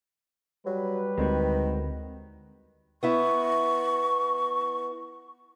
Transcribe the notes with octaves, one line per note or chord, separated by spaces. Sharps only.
F#3 G3 B4
D2 D#3 G#3 C4 F#4
B3 E4 E5 C#6